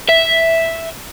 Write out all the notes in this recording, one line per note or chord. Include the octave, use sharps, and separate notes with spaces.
E5